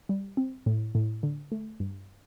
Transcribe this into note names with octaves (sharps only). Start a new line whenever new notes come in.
G3
C4
A2
A2
D3
A3
G2